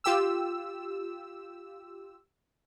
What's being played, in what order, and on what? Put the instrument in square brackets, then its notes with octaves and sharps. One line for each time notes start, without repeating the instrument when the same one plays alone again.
[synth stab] F4 G4 E6